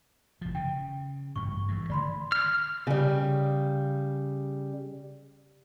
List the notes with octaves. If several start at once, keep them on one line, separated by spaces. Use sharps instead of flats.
F1 F3
C#3 G5
A1 G2 C#3 C#6
G2 E3
D3 D#3 A3 D5 B5 C6
F6
C#3 G3